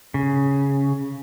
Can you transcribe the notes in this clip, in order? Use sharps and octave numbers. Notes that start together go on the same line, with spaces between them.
C#3